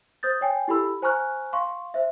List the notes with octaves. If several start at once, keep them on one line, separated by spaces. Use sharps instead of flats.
C5 D#6 G6 A6
C#5 G5 G#5
E4 G4 A4 B5 E6
C5 G#5 A#5 C#6 F6 F#6
F5 C6 C#6
C5 E5